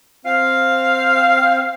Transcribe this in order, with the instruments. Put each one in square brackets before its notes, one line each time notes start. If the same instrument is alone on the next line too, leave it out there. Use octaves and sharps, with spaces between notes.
[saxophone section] C4 F5